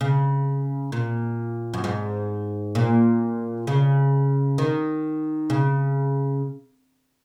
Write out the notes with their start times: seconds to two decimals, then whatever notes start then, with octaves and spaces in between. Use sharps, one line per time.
0.01 C#3
0.92 A#2
1.74 F#2
1.84 G#2
2.75 A#2
3.67 C#3
4.58 D#3
5.50 C#3